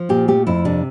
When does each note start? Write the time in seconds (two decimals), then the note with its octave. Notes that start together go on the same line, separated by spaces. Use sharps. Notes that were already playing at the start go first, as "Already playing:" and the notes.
Already playing: F3
0.09 A#2 G4
0.28 A3 G4
0.47 F2 E4
0.65 C3 D4